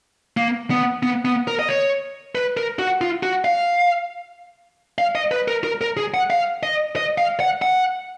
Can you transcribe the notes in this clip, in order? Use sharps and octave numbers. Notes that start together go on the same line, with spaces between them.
A#3
B3
B3
B3
A#4
D#5
C#5
B4
A#4
F#4
F4
F#4
F5
F5
D#5
B4
A#4
A#4
A#4
G#4
F#5
F5
D#5
D#5
F5
F#5
F#5